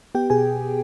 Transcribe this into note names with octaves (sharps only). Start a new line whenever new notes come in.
B3 G4 G5
B2 G#4 G#5